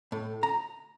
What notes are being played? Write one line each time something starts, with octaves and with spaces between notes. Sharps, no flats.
A2
A#5